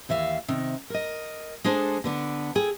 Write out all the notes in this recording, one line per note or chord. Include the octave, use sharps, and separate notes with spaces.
D#2 E3 E5 F5
C3 D#3
A#4 D#5
G#3 D4 G#4 A4 C5
D3 B3 D4
G#4 A4 G5